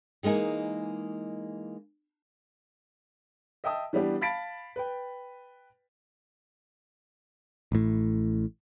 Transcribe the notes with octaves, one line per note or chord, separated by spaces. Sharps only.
E3 G#3 A#3 D#4 G#5
D#5 E5 G5 A5 D#6 E6
E3 G3 B3 D4 G4
F5 A5 B5 A6 B6 D7
B4 G5
A1 A2